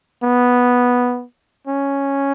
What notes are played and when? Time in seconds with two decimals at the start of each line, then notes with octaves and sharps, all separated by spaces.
0.23 B3
1.67 C#4